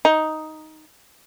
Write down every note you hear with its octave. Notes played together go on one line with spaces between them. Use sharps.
D#4